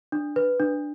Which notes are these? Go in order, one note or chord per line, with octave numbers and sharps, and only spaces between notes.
D4
B4
D4